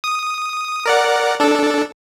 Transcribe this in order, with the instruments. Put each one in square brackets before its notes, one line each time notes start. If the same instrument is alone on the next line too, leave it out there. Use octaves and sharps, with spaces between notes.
[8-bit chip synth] D#6
A#4 D5 F#5
D4 A4